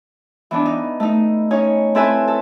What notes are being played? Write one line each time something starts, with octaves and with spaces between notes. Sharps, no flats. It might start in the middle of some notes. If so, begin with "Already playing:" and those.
E3 B3 D4
D#4
A3 D#4
C#4 D#4 C#5
C4 E4 A4 B4 E5 G#5
A4